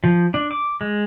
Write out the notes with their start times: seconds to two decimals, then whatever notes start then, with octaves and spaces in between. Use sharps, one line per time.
0.04 F3
0.34 D4
0.51 D6
0.81 G#3